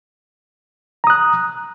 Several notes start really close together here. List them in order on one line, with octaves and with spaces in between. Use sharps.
A#5 D#6 F#6